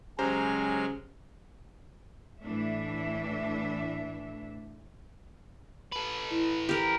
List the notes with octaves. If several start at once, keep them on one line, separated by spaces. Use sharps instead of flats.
C#3 F#3 G#3 G4 C5 G#5 A#5 F6
A2 E3 A3 D4 E5
A4 B4
E4
G4 A#4